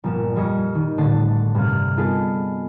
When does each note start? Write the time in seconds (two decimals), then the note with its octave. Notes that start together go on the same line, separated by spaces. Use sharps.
0.04 G1 A#2 F3 E7
0.36 F2 G3 D#5 G#6 A#6 C#7
0.75 D#3
0.98 A1 A2 D3 A3 C6 A6
1.55 G2 C3 F5
1.97 B3 F4 G#4 A4 B4 D#5